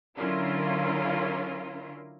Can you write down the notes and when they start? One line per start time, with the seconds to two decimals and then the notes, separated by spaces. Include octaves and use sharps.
0.17 D3 F#3 C#4 E4 F4 A#4